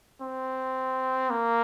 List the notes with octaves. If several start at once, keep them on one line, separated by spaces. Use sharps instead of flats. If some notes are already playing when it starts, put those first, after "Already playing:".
C4
A#3